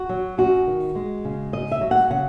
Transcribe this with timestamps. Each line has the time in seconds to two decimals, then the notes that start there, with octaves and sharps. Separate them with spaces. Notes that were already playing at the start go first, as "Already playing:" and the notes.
Already playing: F#4
0.09 F#3
0.38 F#2 F#4
0.67 D#3
0.95 G#3
1.25 C#3
1.53 G#2 D#5
1.71 E5
1.81 F#3
1.91 F#5
2.10 C#3 F#5